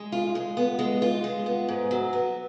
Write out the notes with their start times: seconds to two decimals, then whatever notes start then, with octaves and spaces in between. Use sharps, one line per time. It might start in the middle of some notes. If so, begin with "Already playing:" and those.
Already playing: G#3
0.12 F4
0.35 G#3
0.57 B3
0.79 G#3
1.02 F4
1.24 G#3
1.46 B3
1.68 G#2
1.91 F#3
2.13 B3